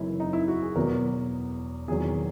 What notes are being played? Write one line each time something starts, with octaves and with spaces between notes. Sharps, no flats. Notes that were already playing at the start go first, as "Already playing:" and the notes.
Already playing: F#1 F#2 E3 D#4 E4
D#4
E4
F#4
G#4
E1 E2 B2 F#3 A#4
E1 E2 D#3 F#3 G#4